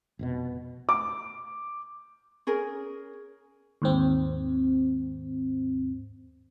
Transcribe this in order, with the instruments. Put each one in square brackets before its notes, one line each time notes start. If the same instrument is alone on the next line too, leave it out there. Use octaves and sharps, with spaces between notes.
[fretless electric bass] F1 G#2 B2
[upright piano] D6
[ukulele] C#4 G#4 A#4
[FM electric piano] D#2 G#2 C4